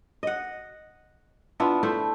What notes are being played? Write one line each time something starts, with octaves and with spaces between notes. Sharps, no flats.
D#5 F#5
B3 D4 E4 F4
A3 E4 C5